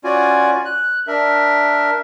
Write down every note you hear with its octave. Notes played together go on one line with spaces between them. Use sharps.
C#4 F4 F#4 D5 G#5
F#6
D4 A#4 E5